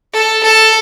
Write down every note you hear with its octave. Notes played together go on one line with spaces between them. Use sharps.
A4
A4